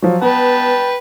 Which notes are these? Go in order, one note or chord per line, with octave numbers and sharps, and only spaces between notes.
F3 F#3
B3 B4 G5 A5